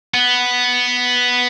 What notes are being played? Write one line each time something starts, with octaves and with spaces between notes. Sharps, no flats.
B3